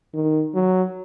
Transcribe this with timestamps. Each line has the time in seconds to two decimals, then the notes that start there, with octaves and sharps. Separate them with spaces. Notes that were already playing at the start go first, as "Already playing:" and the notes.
0.14 D#3
0.54 F#3